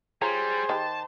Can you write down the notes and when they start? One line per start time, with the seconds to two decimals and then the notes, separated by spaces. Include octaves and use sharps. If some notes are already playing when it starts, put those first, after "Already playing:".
0.22 G3 F4 G#4 C5 C#5 A#5
0.69 D#3 G4 A5